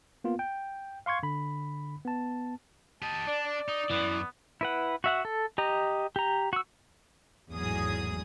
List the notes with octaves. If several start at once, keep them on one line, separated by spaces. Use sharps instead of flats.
A#3 B3 F4
G5
F5 C6 C#6 G#6
D3 B5
B3 A5
G4 D#5 A5
D4 D5
D5
D#4 D#6
F#2 E3 B3
E4 B4 F#5
F#4 E5 F#5
A4
G4 D#5 A#5
G4 A#5
F#4 E6
G#1 E2 A2 F#3 G#4 D#6